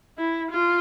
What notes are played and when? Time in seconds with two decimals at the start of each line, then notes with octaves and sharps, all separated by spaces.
0.18 E4
0.51 F4